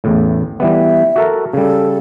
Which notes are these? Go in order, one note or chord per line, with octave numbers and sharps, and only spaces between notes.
A1 E2 A2
E3 G3 B3 E5
F#4 A4 A#4
C#3 G3 A4